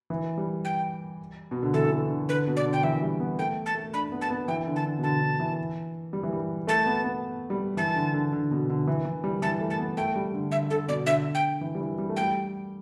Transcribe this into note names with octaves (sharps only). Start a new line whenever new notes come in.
E3
G3
G5
B2
D3
E3 A4
E3
D3
D3
D3 B4
B2
D5
D3
G5
E3 E5
G3
B3
A3 G5
A5
A3
D4 B5
B3
A5
B3
E3 G5
D3
A5
D3
B2
D3 A5
D3
E3
G3
E3
G3
A3 A5
B3
B3
G3
E3 A5
D3
D3
D3
B2
D3
E3
E3
G3
E3 A5
A3
A5
B3
A3 G5
G3
D3
D3 E5
D3 A4
B2 D5
D3 E5
G5
E3
G3
E3
G3
A3
G5
G3